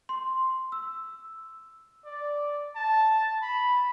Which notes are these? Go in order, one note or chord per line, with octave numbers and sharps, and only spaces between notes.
C6
E6
D5
A5
B5